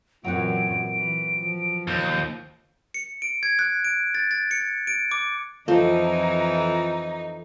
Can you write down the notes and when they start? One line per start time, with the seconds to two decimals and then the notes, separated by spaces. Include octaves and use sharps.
0.24 F#2 A#2 E3 F#3 C4 F#5 D7
0.92 E3
1.38 F3
1.87 D#2 G6
2.94 C#7
3.22 D7
3.43 G#6
3.59 F#6
3.85 D7
4.15 A6
4.31 A6
4.51 C#7
4.87 D7
5.11 D6
5.68 F2 E3 F3 C4 D#4 F4 A4